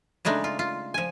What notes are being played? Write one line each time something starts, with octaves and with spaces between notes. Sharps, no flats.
C#3 G#3 A3 D4 D#4
F4
F4
F3 G#5